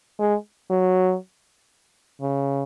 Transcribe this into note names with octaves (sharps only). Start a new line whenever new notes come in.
G#3
F#3
C#3